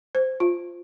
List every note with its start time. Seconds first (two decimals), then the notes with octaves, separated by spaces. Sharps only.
0.15 C5
0.40 F4